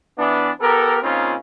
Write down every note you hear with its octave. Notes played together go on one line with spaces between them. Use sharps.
E3 B3 D4
B3 G4 A4 A#4
A#2 C#3 C4 C#4 D#4 F4